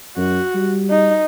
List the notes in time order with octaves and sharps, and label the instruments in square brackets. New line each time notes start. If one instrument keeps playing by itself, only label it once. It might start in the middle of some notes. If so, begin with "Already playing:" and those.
[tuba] F#2 [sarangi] F#4
[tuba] G3
[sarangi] D#4